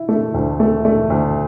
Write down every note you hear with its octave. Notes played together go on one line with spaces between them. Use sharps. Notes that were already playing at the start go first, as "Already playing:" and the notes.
Already playing: E4
A3
D2
A3
A3
D2